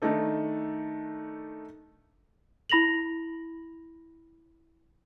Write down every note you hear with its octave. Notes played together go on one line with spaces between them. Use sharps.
D#3 A3 D4 D#4 A4
E4 B5 A#6 F7 F#7